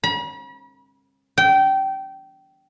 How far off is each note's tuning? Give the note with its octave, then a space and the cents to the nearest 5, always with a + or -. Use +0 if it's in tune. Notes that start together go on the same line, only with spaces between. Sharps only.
B5 -45
G5 -20